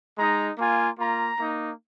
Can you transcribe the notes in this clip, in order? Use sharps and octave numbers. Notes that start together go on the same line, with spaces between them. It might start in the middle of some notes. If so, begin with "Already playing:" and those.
G#3 D#4 A#5
A#3 F4 G#5
A#3 F4 A#5
A#3 D#4